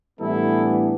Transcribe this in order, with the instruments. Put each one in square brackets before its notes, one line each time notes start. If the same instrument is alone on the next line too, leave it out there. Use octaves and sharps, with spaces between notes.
[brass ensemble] A2 E3 G3 B3 D4 E4 A4